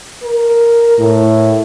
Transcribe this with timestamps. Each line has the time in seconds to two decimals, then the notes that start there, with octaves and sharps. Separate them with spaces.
0.24 A#4
0.99 A2